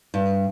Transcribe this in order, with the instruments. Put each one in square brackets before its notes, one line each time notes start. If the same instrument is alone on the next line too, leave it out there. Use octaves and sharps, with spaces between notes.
[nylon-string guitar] G2